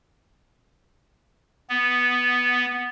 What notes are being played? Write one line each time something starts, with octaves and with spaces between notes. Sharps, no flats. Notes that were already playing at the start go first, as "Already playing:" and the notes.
B3